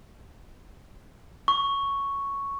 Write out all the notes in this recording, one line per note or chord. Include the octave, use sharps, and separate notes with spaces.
C#6